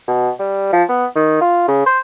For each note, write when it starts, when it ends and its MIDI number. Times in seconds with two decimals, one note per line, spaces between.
0.08 0.31 47
0.39 0.72 55
0.73 0.84 53
0.89 1.06 59
1.16 1.41 51
1.41 1.63 65
1.68 1.86 49
1.86 1.99 72